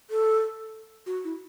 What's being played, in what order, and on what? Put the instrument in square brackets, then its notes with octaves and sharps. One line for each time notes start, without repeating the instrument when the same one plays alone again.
[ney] A4
F#4
E4